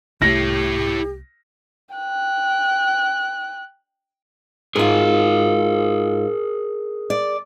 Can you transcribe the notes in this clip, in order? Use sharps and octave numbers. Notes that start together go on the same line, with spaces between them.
C2 A3 E4 G4 C#5 A#6
G5 F#6
G#2 F4 G#4 A#4
D5